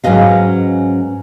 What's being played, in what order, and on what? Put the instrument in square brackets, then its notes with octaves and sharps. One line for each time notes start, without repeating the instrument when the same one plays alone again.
[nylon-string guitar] G#2 F#3 C#4 B4 D#5 F5